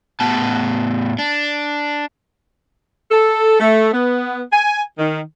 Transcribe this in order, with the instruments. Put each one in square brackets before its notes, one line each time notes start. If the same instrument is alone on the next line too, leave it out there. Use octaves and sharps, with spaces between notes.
[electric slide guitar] A2 B3 A5
D4
[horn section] A4
A3
B3
G#5
D#3